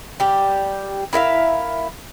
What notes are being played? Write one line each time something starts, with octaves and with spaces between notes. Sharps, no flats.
G3 G4
E4 A#4 E5 F5